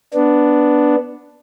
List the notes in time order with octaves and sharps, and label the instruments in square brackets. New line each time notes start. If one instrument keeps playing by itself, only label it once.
[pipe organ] B3 D4